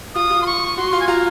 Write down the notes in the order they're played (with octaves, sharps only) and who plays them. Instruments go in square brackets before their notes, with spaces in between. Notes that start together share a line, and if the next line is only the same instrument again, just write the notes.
[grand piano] F4 [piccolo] D#6
[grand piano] F4
[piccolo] C6
C#6
[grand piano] F#4 [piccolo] C6
[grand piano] F4
[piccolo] G#5
[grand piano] F4 [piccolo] A#5